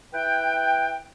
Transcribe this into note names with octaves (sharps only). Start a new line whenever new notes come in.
E4 B4 G5